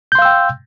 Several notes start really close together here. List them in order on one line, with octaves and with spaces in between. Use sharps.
G6 C6 F5 E6 G5